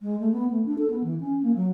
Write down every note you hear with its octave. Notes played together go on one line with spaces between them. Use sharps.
G#3
A3
B3
A3
D4
A4
B3
E3
C#4
A#3
F#3